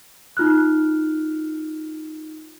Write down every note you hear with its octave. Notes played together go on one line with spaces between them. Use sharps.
D#4 F4 F6 F#6